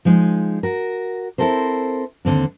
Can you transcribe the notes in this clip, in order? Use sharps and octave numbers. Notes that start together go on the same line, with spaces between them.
F3 G#3 D#4
F#4 A#4
C4 E4 F4 A4 A#4 C5
D#2 D3 C4 D4